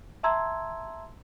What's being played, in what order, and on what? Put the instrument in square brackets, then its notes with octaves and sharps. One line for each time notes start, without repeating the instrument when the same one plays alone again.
[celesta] E5 A5 A#5 C6 E6 G#6